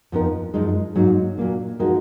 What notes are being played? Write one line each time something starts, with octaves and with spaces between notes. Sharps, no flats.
F2 F3 B3 D#4 A#4
F#2 F3 G#3 D#4
G#2 F#3 A#3 D#4
A#2 F#3 A#3 D4
F3 G#3 D#4 F#4 A#4